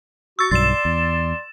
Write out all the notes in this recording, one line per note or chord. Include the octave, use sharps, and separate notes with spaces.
F#4 C#6 E6 A6
B1 G2 F#3 D5 C6 A6 E7
E2